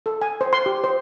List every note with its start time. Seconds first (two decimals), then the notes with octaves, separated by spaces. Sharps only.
0.06 A4
0.21 G#5
0.41 C5
0.53 C6
0.66 G4
0.84 C5